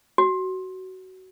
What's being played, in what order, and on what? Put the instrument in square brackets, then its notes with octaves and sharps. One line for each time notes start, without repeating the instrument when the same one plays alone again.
[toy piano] F#4